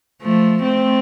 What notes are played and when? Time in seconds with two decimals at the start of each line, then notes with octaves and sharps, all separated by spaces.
0.22 F3 A3
0.63 A3 C4